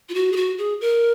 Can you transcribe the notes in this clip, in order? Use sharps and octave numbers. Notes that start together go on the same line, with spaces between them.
F4
F#4
G#4
F#4
G#4
A#4